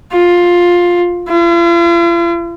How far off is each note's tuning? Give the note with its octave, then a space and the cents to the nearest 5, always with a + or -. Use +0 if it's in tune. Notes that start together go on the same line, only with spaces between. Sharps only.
F4 +10
F4 -45